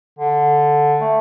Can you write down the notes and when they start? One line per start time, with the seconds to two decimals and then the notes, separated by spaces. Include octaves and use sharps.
0.19 D3
1.01 A3